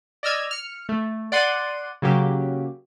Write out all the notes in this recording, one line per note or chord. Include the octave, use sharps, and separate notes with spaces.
D5 D#5 E6 F6 G#6
F6 C#7
A3
D5 F#5 C6 D#7
C#3 F#3 A#3 G4